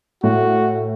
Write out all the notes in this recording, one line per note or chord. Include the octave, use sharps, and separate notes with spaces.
A2 F#4